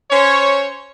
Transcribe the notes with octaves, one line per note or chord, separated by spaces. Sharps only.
C#4 C5 C#5